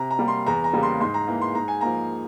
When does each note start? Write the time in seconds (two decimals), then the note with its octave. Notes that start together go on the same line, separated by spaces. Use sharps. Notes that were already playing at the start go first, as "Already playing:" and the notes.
Already playing: C3 A#5
0.11 A#5
0.19 G3 A#3
0.28 C6
0.46 E2 A#5
0.64 A#5
0.73 C#3 G3 A#3
0.83 C6
1.01 G#2 C6
1.14 A#5
1.28 E3 A#3
1.41 C6
1.55 G#2 A#5
1.68 G#5
1.81 F3 A#3 A#5